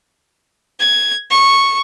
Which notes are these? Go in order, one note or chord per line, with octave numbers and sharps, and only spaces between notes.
G#6
C#6